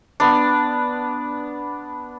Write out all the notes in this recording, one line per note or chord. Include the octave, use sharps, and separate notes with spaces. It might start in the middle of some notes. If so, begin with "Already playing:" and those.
B3 D4